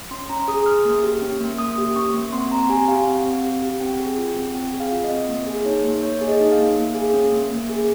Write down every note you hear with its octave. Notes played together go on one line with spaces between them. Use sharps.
C#4 C6
C#4 A#5
G#4 D#6
G#4 F6
A#3
G4
C#4
A#3
A#3 D#6
G4
C#4 C#6
A#3
C4 C6
C4 A#5
G4 G#5
G4 F5
C4 F5
C4
G4
G4
C4 G5
G#4
F4
C4
C4 G5
G#4
F5
F4
D#5
C4
A#3
G#4
D#4 C#5
A#3
A#3 C#5
G#4
D#5
D#4
F5
A#3
A#3
G#4
C#4
A#3
A#3
G#4